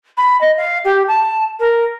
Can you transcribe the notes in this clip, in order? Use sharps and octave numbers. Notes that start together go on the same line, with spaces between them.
B5
D#5
F5
G4
A5
A#4